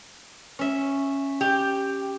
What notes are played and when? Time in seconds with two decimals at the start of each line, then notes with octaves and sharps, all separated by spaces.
0.59 C#4 E5
1.41 G4